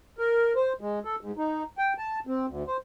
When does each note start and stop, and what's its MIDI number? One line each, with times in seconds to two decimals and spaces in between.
0.19 0.53 70
0.56 0.73 72
0.81 0.99 56
1.05 1.16 69
1.21 1.31 44
1.37 1.63 63
1.78 1.93 79
1.98 2.19 81
2.27 2.46 60
2.48 2.63 38
2.67 2.77 72